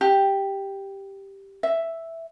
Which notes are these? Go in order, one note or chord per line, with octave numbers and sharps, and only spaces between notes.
G4
E5